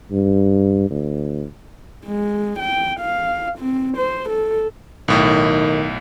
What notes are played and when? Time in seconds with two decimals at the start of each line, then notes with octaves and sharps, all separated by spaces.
0.12 G2
0.91 D2
2.06 G#3
2.60 G5
3.00 F5
3.59 C4
3.97 C5
4.30 A4
5.08 B1 A2 D#3